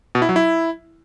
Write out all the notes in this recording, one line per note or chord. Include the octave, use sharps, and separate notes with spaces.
B2
E4
F#3
E4